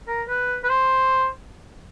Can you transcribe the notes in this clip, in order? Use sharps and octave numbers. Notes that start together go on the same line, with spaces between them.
A#4
B4
B4
C5